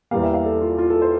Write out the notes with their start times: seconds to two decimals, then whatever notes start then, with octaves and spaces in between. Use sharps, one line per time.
0.11 E2 E3 G3 A#3 F5
0.23 E5
0.34 F5
0.45 A4
0.61 F4
0.78 F4
0.90 A4
1.02 C5